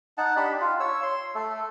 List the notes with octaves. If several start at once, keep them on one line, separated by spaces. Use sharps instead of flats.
D#4 F#5 A5
D4 G4 B5
F4
C#5 E6
C6
A3 A4